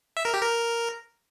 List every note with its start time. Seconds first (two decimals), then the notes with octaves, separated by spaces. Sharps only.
0.17 E5
0.25 A#4
0.34 G4
0.42 A#4